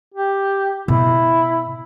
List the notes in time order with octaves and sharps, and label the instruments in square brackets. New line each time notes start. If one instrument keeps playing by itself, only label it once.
[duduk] G4
[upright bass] B2 [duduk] E4